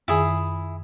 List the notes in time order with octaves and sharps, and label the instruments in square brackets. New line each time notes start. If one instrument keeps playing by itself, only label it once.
[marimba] F#2 D#3 [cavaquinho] E4 G#4